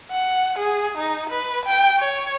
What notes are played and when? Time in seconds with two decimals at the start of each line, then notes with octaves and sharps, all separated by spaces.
0.11 F#5
0.58 G#4
0.97 D#4
1.30 B4
1.65 G5
1.99 C#5